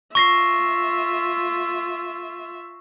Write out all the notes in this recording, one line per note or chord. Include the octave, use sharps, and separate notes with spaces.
F4 E5 C#6 A#6 C7